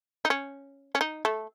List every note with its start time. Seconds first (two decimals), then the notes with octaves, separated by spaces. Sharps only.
0.25 D#4
0.30 C#4
0.95 C#4
1.01 D#4
1.25 A3